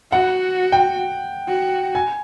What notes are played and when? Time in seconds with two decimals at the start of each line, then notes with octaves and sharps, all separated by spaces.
0.12 F#4 F#5
0.72 G5
1.48 F#4
1.95 G#5